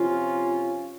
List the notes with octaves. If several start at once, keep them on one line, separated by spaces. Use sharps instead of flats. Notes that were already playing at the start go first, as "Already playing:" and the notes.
Already playing: C3 F3 C#4 F4